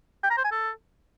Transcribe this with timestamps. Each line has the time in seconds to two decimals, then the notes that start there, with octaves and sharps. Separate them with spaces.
0.23 G5
0.30 A#5
0.37 C5
0.44 G#5
0.51 A4